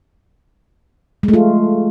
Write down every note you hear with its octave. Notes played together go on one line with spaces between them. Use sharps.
G#3
A3
F4